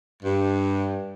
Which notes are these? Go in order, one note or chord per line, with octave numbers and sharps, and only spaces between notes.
G2